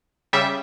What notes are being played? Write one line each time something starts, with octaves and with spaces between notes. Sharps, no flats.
C#3 G3 E5